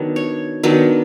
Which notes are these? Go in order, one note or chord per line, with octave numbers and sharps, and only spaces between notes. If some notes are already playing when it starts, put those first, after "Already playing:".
Already playing: D#3 F#3 B3 D4
C#5
D#3 F#3 B3 D4